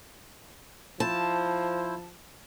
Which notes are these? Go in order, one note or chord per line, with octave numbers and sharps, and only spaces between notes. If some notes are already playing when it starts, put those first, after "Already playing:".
F3 E4 C5 A5